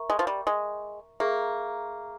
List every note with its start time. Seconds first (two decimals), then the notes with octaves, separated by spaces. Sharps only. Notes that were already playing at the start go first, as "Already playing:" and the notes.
Already playing: A#4 E5 A#5 C#6
0.10 G#3
0.19 F3
0.27 G3
0.47 G#3
1.20 A#3 G#4 E5 A#5 C#6